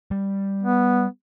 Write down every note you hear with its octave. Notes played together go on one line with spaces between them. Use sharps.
G3
B3